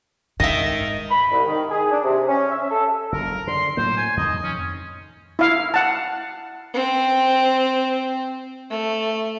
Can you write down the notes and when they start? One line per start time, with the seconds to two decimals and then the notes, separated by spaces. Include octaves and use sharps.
0.40 G#2 D#3 D#5 E5
1.10 B5
1.32 C2
1.47 D#3
1.71 G#4
1.92 D4
2.05 C3
2.29 C#4
2.52 E5
2.71 A4
3.12 F#1 A#4
3.47 D3 C6
3.77 A2 F#3 A#3 C5
3.97 G#5
4.17 F2 D#3 D#5
4.43 C#4
5.39 E4 F5
5.74 F#5 A5
6.74 C4
8.70 A3